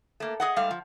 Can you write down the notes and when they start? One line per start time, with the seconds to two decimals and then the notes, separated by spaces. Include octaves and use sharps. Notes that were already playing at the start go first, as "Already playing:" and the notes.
0.20 A3 A#3
0.40 G#4 D#5 F#5
0.56 G#2 G3 A3 F5
0.71 F3